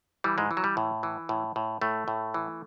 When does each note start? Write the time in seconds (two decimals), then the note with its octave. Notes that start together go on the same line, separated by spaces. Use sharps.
0.24 E3 G3
0.38 G#2 G#3
0.51 E3
0.57 F#3
0.64 G3
0.77 A2
1.03 E3
1.29 A2
1.56 A2
1.81 A2 A3
2.08 A2
2.34 E3